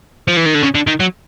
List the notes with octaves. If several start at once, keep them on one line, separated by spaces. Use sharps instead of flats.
F3
E3
D#3
D3
C#3
D3
D#3
F#3